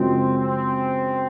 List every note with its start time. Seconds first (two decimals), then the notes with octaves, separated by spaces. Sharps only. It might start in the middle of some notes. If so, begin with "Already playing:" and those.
Already playing: F#2 C#3 F3 G#3 C4 C#4
0.37 C4